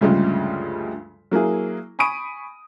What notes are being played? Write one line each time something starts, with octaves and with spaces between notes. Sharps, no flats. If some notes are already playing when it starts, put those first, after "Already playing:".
D2 G2 C#3 F3 G3 G#3
F#3 A#3 E4 G#4
G#5 B5 C#6 D#6 D7 D#7